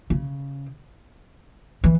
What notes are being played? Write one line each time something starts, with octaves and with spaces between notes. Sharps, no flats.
C#3
E3